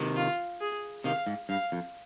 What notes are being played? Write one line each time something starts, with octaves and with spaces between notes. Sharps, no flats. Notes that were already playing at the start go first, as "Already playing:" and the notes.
Already playing: C3 D#3
F4
G#4
C3 D#3 F5
G#2
G2 F5
F2